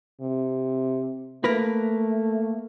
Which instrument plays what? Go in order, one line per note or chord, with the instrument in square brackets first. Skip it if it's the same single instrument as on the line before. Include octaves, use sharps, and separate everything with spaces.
[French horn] C3
[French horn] A3 [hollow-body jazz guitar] A#3 A#4 B4